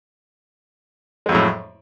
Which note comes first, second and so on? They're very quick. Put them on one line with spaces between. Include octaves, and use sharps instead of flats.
G#3 F2 F#3 A2